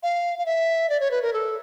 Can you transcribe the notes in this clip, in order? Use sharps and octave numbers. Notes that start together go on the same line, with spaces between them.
F5
F5
E5
D5
C#5
B4
A#4
A4